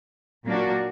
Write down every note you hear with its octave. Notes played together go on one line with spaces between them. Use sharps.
A#2 F#3 A#3 D4 F#4